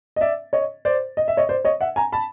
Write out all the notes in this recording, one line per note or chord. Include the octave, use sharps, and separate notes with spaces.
D#5
D5 E5
C#5 D#5
C5 D5
D#5
E5
C#5 D#5
C5 D5
C#5 D#5
E5 F#5
G#5 A#5
A5 B5